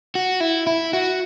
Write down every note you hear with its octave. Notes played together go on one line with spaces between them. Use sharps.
F#4
E4
E4
F#4